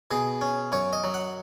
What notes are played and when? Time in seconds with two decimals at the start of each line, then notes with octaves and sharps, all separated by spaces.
0.11 B2 G#4
0.41 C#4
0.72 F#2 C#5
0.93 D#5
1.04 F#3
1.14 F#5